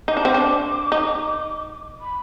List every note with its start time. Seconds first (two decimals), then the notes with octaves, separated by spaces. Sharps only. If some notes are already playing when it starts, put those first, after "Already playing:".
0.08 D#4 D6
0.17 D4
0.25 C4
0.34 D4
0.92 D#4
2.01 B5